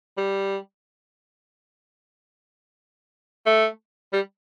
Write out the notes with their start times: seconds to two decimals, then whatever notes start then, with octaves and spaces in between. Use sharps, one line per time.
0.17 G3
3.46 A3
4.13 G3